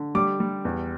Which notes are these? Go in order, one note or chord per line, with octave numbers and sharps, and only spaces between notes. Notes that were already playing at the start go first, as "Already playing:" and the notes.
Already playing: D3
G3 D6
G3
E2